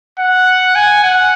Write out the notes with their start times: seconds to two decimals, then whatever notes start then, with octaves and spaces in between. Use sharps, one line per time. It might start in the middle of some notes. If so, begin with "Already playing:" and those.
0.20 F#5
0.75 G#5
1.03 F#5